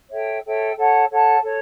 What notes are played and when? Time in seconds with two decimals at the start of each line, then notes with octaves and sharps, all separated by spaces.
0.12 A4 C#5 E5 G5
0.45 A4 C#5 E5 G5
0.78 A4 C#5 F#5 A5
1.11 A4 C#5 F#5 A5
1.44 A4 C#5